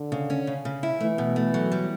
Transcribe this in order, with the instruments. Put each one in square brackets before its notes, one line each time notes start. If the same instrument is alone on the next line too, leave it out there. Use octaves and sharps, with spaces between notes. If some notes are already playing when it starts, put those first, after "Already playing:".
Already playing: [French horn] D3
[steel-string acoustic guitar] C#3
C#4
C#3
C#3
E4
[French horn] E3 [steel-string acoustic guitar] A3
[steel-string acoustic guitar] B2
A3
F#3
G3